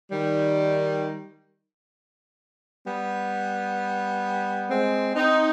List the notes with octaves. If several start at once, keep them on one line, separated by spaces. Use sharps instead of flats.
D#3 G3
G3 B3
G#3 C4
C4 D#4